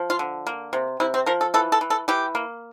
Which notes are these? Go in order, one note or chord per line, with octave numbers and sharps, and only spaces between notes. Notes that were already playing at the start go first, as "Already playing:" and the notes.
Already playing: F3
F4
D3
A#3
C3
C3 E4
C4
F3 A#4
A4
E3 A4
A4
E3
A4
E3 G4
A#3